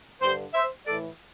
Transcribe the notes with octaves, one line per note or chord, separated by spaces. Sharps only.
G2 D3 G4 C5
C5 E5
A2 E3 A4 D5